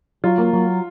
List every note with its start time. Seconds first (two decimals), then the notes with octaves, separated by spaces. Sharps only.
0.24 F#3 F4
0.38 A#3
0.53 F#3